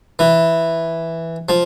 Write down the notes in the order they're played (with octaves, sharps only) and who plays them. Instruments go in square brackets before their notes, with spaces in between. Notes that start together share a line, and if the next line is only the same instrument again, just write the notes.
[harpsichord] E3
F3